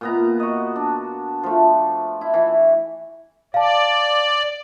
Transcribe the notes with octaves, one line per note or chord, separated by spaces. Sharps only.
A#2 B3 A#5
F#4 D#5
D4
F3 A3
E4
E3 E4
D5 F5 A5